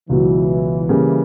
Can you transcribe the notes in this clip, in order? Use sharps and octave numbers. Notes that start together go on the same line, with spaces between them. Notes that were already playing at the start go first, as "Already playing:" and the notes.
C#2 B2 E3 F#3
C#3 G3 A#3